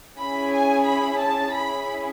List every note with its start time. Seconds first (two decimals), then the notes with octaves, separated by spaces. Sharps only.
0.18 C#4 E4 G#4 B5
0.52 G#5
0.85 B5
1.19 A5
1.52 C#4 E4 G#4 B5